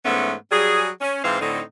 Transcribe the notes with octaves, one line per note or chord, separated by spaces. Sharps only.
G#2 E3 A3 B3 C#4
F#3 G3 G#4
C#4
G#2 E3 C4 F5
A2 D3 C4 D#4